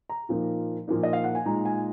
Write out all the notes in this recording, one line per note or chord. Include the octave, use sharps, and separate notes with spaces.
A#5
A#2 F3 A#3 D#4
A#2 F3 A#3 D#4
D#5
F5
F#5
G#5
A#2 G#3 D#4 A#5
G#5